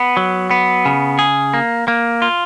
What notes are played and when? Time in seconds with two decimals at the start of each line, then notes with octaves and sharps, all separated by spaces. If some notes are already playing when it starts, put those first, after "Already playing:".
Already playing: B3
0.17 F#3
0.51 B3
0.85 C#3
1.19 G#4
1.54 A#3
1.88 A#3
2.22 F4